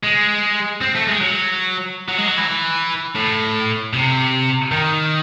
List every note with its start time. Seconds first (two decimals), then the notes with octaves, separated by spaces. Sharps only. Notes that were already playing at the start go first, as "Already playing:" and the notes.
0.03 G#3
0.81 C4
0.95 A3
1.08 G#3
1.21 F#3
2.09 F#3
2.18 G#3
2.28 F#3
2.38 E3
3.16 A2
3.93 C3
4.72 D#3